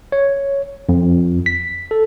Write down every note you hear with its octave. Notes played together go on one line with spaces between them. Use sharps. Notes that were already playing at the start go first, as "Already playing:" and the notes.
C#5
F2
B6
A4